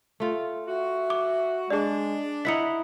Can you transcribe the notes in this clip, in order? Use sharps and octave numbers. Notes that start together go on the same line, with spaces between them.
A3 F4
F#4 E5
D6
G#3 D4 G#4 D5
D#4 E4 D#5 F#5 B6 C#7